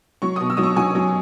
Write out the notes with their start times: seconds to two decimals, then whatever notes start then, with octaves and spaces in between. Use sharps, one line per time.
0.22 F#3 C#6
0.36 B2 D#6
0.50 E6
0.57 F#3 D#6
0.63 C#6
0.76 F#3 G#5
0.95 F#3